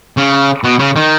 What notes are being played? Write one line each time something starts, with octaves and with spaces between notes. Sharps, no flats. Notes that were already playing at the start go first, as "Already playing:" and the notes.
C#3
B2
C#3
D#3